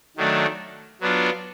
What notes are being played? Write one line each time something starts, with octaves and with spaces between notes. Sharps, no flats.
D#3 F#3 A3 D4
F#3 B3 D4 F4